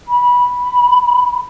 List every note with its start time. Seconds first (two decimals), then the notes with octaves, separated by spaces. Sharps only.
0.08 B5